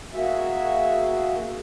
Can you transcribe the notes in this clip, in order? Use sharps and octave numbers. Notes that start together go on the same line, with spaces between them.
A#3 F#4 G#4 E5